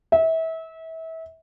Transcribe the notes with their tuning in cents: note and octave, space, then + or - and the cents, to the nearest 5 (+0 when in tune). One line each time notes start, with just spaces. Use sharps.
E5 -30